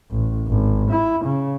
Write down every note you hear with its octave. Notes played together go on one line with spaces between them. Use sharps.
A1
G#1
E4
C#3